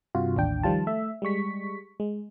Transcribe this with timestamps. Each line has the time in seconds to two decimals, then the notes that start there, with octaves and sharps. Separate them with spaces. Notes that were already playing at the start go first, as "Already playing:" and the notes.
0.15 G2 C3 F4 F#4
0.36 A1 D#2 D4 G5
0.63 D#3 F3 G3 F4 A5
0.87 A3 E5
1.22 G3 G#3 C#6 B6
2.00 G#3